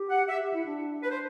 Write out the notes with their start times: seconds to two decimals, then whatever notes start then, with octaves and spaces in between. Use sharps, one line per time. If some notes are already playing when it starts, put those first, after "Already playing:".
Already playing: G4
0.10 F#5
0.29 G4 E5
0.41 G4
0.53 E4
0.66 D4
1.03 B4
1.10 C5